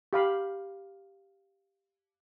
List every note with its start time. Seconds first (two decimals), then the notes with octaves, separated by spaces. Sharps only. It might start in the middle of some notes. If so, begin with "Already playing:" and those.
0.13 G4 F5 B5